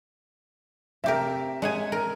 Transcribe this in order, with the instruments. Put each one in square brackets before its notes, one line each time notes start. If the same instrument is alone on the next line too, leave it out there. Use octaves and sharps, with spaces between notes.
[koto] C3 G4 A#4 [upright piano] E5
[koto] G#3 F#5 G#5
A#4